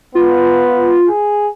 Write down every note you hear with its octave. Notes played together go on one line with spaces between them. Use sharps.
B3 F4
G#4